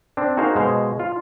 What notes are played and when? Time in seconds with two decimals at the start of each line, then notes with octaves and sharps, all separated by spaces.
0.17 C4 D4
0.37 D#4 F#4 G#4 A#4 C5 F5
0.56 B2 G#3 C5 F5
1.00 F4